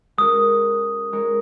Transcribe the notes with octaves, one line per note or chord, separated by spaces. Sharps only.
G#3 C#4 F#4 A#4 C#5 D#6
G#3 D#4 A#4 C#5